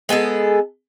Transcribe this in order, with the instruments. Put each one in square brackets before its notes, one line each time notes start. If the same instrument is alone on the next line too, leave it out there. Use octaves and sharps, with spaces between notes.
[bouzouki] G#3 B3 G#4 A4